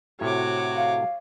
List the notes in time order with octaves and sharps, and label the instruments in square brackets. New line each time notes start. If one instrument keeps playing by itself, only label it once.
[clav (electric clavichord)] A2 C3 [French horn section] F#4 [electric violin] C#5 D6
[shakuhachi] F5